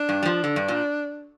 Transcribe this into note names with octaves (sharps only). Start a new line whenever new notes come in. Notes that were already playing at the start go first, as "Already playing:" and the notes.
Already playing: D4
G2
G3
F3
D3
G2
A#2